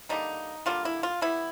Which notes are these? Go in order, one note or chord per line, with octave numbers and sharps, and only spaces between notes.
D3 G3 A#3 D#4
D3 G3 A#3 F4
E4
F4
E3 G3 B3 E4